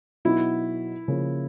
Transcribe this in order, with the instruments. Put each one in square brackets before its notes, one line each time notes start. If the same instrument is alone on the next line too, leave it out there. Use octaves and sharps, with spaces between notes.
[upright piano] B2 F#3 B3 D#4 F#4 [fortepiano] E4
[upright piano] C#3 F3 A#3 C#4